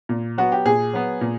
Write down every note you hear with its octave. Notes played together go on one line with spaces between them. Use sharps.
A#2
F#3 B3 F#4
G4
A#2 G#4
F#3 B3
A#2